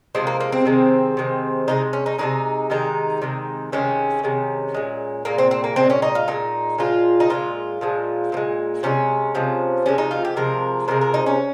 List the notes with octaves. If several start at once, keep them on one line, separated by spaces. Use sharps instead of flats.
C3 F3 G#3 C4
A#3
A#3
C4
C3 D#3 G#3
C3 D#3 G#3
C3 D#3 G#3 D#4
C#4
D#4
C3 D#3 G#3 D#4
C3 D#3 G#3 D#4
C3 D#3 G#3
C3 D#3 G#3 C#4
C3 D#3 G#3
A#2 G#3
A#2 G#3 A#3
C4
C4
A#3
A#2 G#3 C4
C#4
D#4
F4
A#2 G#3 D#4
A#2 F3 G#3 F4
D#4
A#2 F3 G#3 F4
A#2 F3 G#3
A#2 F3 G#3
C3 F3 G#3 C#4
C3 F3 G#3
C3 F3 G#3 C#4
D#4
F4
G4
C3 F3 G#3 A#4
C3 F3 G#3 A#4
A#4
D#4
C#4